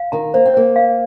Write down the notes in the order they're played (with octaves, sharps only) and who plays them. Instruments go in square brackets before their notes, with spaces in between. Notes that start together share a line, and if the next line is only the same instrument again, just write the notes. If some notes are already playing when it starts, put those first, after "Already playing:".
Already playing: [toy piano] F5
[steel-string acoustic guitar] D#3 [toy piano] A#5
[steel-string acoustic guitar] A#3 [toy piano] C5
[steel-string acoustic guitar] C4
[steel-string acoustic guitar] A#3 [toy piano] C5
[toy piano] F5